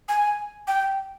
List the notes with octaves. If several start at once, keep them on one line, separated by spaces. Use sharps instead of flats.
G#5
G5